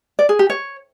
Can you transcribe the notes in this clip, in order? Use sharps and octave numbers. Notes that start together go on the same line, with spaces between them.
D5
G#4
G4
C#5